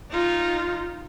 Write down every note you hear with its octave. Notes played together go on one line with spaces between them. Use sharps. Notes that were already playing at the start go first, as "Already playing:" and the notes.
D#4 F4